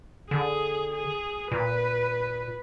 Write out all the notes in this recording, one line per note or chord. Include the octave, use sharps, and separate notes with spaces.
D3 G#4
G#4
A#2 B4